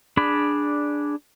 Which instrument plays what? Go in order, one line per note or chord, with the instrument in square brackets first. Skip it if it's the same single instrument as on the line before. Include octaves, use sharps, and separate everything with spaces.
[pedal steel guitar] D4 G#4 D5 B5